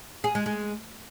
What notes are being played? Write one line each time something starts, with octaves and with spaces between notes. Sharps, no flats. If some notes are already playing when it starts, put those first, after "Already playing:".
G#4
G#3
G#3